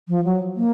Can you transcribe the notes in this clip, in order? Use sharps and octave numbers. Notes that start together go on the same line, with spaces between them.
F3
F#3
A#3